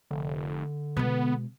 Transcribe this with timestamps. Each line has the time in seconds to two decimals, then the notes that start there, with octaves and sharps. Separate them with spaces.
0.11 F1 D3
0.97 B2 G#3 B3